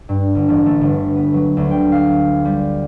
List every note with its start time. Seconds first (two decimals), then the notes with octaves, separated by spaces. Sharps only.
0.09 G2
0.35 G1
0.48 A1
0.66 A3
0.81 G1
1.16 B3
1.34 F#3
1.57 D2
1.71 G5
1.92 F5
2.45 G3